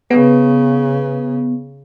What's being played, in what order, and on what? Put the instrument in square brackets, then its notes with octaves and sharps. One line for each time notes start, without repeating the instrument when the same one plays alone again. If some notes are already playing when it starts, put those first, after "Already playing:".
[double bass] C#3 [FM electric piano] B3